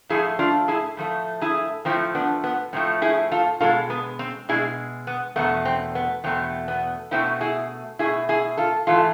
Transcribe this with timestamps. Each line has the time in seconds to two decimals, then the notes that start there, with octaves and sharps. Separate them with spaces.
0.09 A2 F3 A3 E4 G#4
0.39 D4 F4
0.68 E4 G#4
0.97 A2 F3 A3
1.41 E4 G#4
1.85 A2 F3 A3 C4 E4
2.15 B3 D4
2.44 B3
2.73 A2 F3 A3 C4
3.02 E4 G#4
3.32 F4 A4
3.60 B2 G#3 F4 A4
3.90 B3
4.19 C4
4.49 B2 G#3 E4 G#4
5.07 B3
5.36 E2 B2 A3 B3
5.65 C4
5.95 B3
6.24 E2 B2 A3 C4
6.68 B3
7.11 B2 A3 C4 E4
7.41 E4 G#4
7.99 A3 E4 G#4
8.04 B2
8.29 E4 G#4
8.57 F4 A4
8.87 G#2 E3 A3 F4 A4